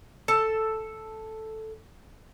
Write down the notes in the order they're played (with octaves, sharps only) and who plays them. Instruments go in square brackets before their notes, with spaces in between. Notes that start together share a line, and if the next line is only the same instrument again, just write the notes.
[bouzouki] A4 A5